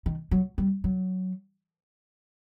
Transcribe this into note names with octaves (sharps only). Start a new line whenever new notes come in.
D#3
F#3
G3
F#3